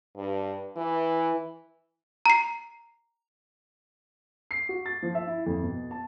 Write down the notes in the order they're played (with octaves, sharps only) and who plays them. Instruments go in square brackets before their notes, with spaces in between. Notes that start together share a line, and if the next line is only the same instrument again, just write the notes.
[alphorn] G2
E3
[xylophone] A#5 C7
[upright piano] C7
F#4
A6
F3
E5
E4
F2
B2
A5